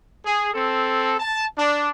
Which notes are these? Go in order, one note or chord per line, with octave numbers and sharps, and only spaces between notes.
G#4
C4 A4
A5
D4